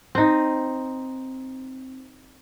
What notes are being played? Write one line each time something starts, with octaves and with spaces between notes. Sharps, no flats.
C4 D#4